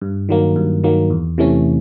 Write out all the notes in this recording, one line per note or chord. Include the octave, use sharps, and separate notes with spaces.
G2
D#3 F#3 A#3
G2
D#3 F#3 A#3
E2
C3 E3 A3 C#4